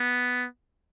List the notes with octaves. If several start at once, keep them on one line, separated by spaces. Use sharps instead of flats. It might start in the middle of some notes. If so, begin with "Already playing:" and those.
Already playing: B3